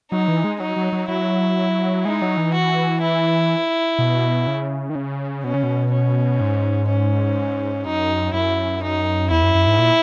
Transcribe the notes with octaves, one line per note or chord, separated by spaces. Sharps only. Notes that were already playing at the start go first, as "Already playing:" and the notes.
F#3 D#4
E3
G#3
F#3 D#4
F#3
F#3
F#3 E4
G#3 D#4
F#3
E3
F#4
E4
B2
C#3
D#3
C#3
B2 C#4
C#3
B2
C#4
G#2
C#4
F#2 D#4
F#2 E4
D#4
E2 E4
F#2
F#2
G#2
A#2